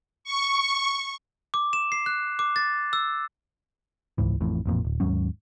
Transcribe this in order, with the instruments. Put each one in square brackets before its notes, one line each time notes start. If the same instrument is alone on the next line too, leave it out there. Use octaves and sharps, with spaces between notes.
[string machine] C#6
[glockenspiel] D6
E7
C7
F#6
D6
A6
E6
[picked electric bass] D#1 C#2 G#2 E3
A1 F2 A2
A1 F2 A#2
D1
D#2 G#2 F#3 C#4